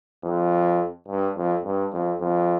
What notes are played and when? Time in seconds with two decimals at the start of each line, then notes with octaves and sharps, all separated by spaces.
0.24 F2
1.08 G2
1.36 F2
1.64 G2
1.93 F2
2.20 F2